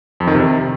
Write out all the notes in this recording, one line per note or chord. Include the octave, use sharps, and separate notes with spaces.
F2
D#3
C3